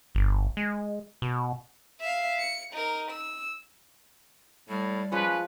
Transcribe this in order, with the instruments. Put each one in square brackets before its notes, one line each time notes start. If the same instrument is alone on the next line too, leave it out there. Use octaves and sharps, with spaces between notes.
[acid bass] G1
G#3
B2
[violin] E5 F5
C#7
D#4 A#4
E6
[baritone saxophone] A2 [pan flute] G3
[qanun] F3 G#3 F4 [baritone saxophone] C#4 [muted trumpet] B4